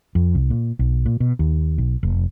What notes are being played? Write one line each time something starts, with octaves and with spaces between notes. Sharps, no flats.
F2
C2
A#2
B1
A#2
B2
D#2
B1
F1